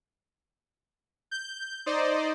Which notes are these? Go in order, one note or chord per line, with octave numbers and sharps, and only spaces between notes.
G6
D#4 C5 D5 D#5